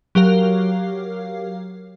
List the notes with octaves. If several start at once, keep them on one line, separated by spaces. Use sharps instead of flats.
F#3 G4 A#4 F5